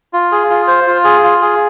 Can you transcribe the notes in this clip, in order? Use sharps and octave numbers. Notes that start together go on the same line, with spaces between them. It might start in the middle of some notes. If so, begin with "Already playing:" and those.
F4
G#4
F4
C5
F4
G#4
F4
G#4